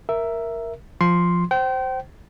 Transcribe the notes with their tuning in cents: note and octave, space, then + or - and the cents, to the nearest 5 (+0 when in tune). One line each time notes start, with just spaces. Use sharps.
A#4 +0 E5 +5
F3 +0 C6 +0
C5 +0 G5 -35